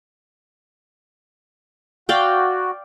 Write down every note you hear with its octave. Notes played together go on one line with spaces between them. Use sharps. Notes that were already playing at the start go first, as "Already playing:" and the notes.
F#4 D5 F5 G5